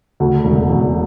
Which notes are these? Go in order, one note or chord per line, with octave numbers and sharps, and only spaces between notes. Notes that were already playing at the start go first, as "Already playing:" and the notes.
D2
E1
E1